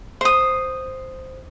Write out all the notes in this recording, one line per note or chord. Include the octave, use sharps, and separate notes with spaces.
C5 D#6